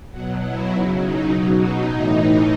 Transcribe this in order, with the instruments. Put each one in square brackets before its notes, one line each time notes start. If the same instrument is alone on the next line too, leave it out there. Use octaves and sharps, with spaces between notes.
[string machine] B2 F#3 F#4
E4
C#3 F#3 D#4
D#4
B2 F#3
D#4
A2 E3 D#4